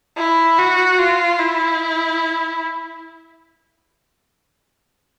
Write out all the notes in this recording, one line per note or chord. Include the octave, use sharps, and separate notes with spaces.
E4
F#4
F4
E4